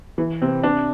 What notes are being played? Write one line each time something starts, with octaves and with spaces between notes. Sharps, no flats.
E3
C3 C4
C3 D4